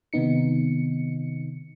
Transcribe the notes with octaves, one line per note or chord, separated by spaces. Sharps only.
C3 D#3 B3 D#4 C#7